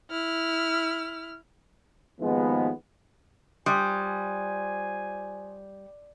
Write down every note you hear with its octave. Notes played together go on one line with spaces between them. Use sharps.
E4 F6
D#2 G#2 F3 G#3 B3
G3 F4 C5 G#5 C6 D#6 F#6